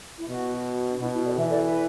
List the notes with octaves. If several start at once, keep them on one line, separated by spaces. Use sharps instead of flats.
E4
B2 F#4
D4
B2 E4
E4
A4 D5
E3 B4 E5
A4 D5
B4